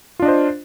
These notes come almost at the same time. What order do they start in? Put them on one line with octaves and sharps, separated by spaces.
F4 D4 D#5 C5